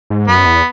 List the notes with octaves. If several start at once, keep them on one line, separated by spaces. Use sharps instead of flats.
G#2
F#2 B3
E2